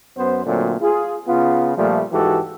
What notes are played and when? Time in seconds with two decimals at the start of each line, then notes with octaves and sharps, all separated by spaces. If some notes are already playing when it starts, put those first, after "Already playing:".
0.17 F#2 B3 C5
0.46 A#2 D3 F#3 A3 C4
0.81 F4 G#4
1.28 C#3 B3 F4
1.77 A#2 F3 G3 A3
2.12 G#2 E3 F#4 G4 A4